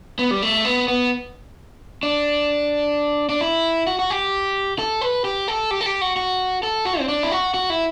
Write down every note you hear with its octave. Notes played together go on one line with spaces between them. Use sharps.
B3
G3
A3
B3
B3
D4
D4
E4
F#4
F#4
G4
A4
B4
G4
A4
G4
A4
G4
F#4
F#4
A4
F#4
C4
D4
E4
F#4
F#4
E4